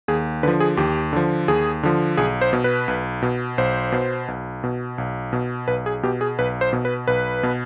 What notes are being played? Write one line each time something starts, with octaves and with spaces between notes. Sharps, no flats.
D#2 G#4
D3 F3 B4
G#4
D#2 G4
D3 F3
D#2 G#4
D3 F3
B1 G#4
C5
B2
B4
B1
B2
B1 C5
B2
B1
B2
B1
B2
B1 B4
G#4
B2 G4
G#4
B1 B4
C5
B2
B4
B1 B4
B2